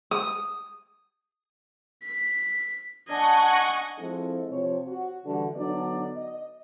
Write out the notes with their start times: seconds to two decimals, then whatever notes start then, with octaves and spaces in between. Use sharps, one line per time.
0.11 D#6
2.03 B6
3.09 D4 D#5 F#5 G#5 C#6
3.98 F3 G#3 C4 E4 A4
4.49 C3 F3 C4 C#5
4.87 F#4
5.26 D3 E3 G3 F#4
5.55 D3 F#3 B3 D4 D#4 D5
6.17 D#5